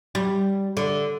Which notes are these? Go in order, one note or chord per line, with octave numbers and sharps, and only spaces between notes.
G3
D3